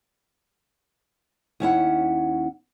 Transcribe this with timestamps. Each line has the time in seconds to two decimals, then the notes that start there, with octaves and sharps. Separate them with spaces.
1.60 D#2 C#4 E4 F#5